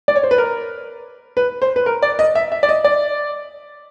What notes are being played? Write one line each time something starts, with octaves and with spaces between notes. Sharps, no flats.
D5
C#5
C5
B4
A#4
B4
C5
B4
A#4
D5
D#5
E5
E5
D5
D#5
D5